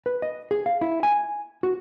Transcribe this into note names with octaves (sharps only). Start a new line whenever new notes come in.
B4
D#5
G#4
F5
E4
G#5
F#4